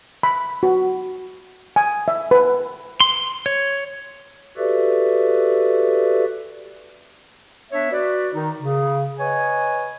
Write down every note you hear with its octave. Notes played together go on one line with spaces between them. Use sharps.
B5
F#4
G#5
E5
B4
C6
C#5
F#4 G4 A4 B4 D5 E5
B3 D4 C#5 E5
F#4 B4 D5
D#3 D#4
C#3
B4 C#5 D#5 G#5